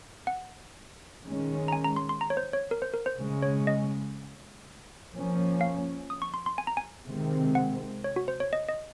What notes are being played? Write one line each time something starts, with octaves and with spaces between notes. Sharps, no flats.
F#5
D#3 G#3 C#4
A#5
G#5
A#5
C6
C6
A#5
C#5
C5
C#5
A#4
C5
A#4
C5
C#3 G#3 C#4
C#5
D#5
F3 A#3 C#4
F5
D#6
C#6
C6
C6
G#5
A#5
G#5
C3 D#3 G#3 C4
F#5
C#5
F#4
C5
C#5
D#5
D#5